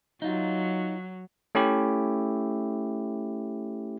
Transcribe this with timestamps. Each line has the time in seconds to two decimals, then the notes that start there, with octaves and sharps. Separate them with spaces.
0.22 F#3 D#4 F4
1.55 A3 C#4 E4 G4